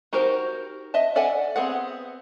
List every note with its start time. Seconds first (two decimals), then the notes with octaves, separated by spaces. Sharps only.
0.13 D#4 F#4 G4 A#4 C5
0.94 D#5 E5 A5
1.16 A4 D5 E5 F#5 G#5
1.56 B3 C4 G#4 F#5